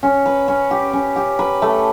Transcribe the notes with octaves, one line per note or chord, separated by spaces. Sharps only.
C#4
B4
C#4
G4
C#4
G4
B4
A3